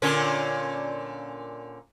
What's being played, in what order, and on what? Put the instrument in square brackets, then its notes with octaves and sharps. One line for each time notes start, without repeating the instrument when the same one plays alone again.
[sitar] A#2 D3 C#4